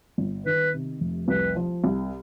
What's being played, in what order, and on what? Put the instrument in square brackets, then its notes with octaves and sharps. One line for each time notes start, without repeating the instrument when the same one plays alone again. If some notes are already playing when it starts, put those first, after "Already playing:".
[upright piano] G1
[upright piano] D#3 [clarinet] B4
[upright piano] C3
F1
[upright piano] C2 [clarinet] B4
[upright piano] F3
C2